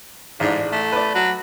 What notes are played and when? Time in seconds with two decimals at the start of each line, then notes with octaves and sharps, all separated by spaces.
0.40 A1 G#2 D4
0.72 A3
0.92 B4 D5
1.15 F#3